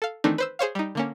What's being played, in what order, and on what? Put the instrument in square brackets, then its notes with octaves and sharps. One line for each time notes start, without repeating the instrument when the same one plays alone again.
[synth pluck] A4 F5
D#3 E3 A3 C4 D4 D#4
B4 C5 E6
G#4 C5 C#5 F5
G3 D#4
D3 A#3 C#4